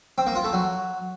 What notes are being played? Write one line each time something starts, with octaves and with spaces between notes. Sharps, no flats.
C4
A#3
F4
A3
F#3